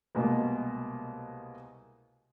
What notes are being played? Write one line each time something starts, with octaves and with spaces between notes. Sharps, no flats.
C2 B2 G#3 A#3